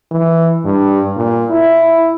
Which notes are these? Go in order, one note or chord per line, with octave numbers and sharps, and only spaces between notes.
E3
G2
A#2
E4